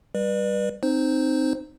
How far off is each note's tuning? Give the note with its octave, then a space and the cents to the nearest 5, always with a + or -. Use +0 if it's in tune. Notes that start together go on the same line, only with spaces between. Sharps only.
G3 +0 B4 -25 D5 +35
C4 +0 D#4 -15 C5 +0